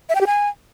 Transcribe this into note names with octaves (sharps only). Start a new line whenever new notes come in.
E5
G5
G4
G#5